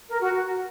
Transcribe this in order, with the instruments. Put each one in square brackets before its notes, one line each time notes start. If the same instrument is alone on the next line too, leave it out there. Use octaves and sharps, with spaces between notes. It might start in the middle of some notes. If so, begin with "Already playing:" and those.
[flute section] A#4
F#4